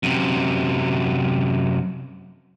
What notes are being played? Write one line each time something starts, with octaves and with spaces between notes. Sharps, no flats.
F#2 C3